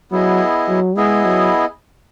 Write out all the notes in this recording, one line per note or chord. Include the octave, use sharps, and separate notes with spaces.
F#3 B3 E4 G#4 D#5
F#3
G#3 B3 E4 G#4 D#5
F#3